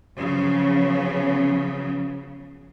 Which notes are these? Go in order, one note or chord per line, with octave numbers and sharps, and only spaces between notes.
C#3 F3 F#3 B3